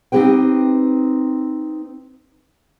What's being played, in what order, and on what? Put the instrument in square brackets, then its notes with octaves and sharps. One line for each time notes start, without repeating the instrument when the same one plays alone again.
[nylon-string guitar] C4 D#4 E4 G4 B4 G5